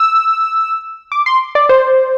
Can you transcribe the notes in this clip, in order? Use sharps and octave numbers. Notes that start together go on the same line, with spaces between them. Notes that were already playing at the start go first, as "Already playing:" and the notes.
Already playing: E6
D6
C6
D5
C5